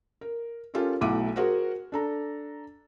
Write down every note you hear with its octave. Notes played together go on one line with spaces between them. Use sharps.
A#4
C#4 F4 G4 A4 A#4
B1 A3 E4 F#5 D6 D#7
F#4 G#4 A#4 C5 F#5
D4 A4 A#5